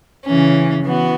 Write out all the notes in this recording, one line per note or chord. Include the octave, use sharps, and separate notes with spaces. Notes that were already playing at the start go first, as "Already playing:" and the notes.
C#3 E3 C#4
E3 B3 F#4